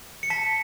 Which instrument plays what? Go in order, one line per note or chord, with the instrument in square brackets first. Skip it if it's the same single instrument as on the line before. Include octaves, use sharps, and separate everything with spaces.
[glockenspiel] C#7
A5 B6